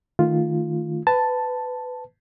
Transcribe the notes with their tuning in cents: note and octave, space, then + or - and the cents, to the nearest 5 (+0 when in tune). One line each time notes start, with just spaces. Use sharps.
D#3 +0 A3 +0 F4 +0
B4 +20 A5 +0